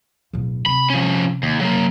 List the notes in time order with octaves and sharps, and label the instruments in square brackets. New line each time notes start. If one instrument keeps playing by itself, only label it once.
[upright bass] D1 B2
[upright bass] C3 [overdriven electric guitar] B5
[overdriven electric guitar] F3 C#4
D#2
F#3 A#3